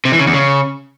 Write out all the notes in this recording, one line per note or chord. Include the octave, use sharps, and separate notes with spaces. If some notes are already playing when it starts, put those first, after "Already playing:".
C3
E3
C#3
E2
C#3